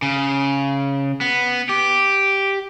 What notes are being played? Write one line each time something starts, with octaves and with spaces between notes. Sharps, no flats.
C#3
B3
G4